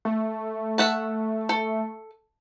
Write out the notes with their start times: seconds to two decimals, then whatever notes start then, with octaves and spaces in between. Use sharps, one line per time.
0.05 A3
0.78 E5 F#5 A5
1.49 A4